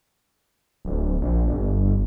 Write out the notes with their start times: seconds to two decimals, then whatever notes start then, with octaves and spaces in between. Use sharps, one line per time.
0.85 D1
1.21 A#1
1.48 G1